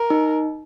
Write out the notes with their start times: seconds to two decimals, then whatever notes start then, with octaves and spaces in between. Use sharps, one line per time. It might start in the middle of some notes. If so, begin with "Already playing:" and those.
Already playing: A#4
0.10 D#4